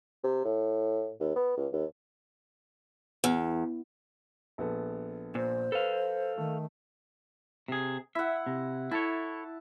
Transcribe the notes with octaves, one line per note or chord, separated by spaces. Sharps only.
C3
A2
D#2
B3
C#2
D#2
E2
A#1 B3 A4
A#2 C5
A4 B4 F5
D#3 A3
C3 G#4
E4 E5 F#5
C3
E4 A4 C#5 A5